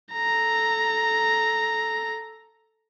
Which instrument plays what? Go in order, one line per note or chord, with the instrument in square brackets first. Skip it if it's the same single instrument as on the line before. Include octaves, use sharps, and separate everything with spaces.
[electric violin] A4 A#5